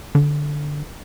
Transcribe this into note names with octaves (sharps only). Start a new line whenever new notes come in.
D3